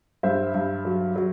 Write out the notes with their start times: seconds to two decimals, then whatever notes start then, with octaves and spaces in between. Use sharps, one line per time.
0.23 G2 C5 E5
0.54 G2
0.85 F#3
1.16 F#3